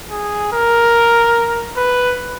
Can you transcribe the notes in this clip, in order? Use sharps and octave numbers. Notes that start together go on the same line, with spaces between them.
G#4
A#4
B4